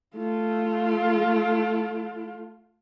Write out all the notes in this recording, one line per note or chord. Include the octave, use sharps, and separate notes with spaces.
A3 F4